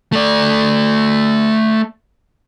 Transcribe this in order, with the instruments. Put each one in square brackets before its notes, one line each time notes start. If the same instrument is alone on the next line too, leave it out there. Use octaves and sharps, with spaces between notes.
[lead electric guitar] A3 D5